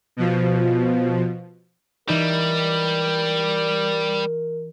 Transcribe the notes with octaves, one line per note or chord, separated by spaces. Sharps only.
B2 F3
E3 G3 D#4 A#4 E7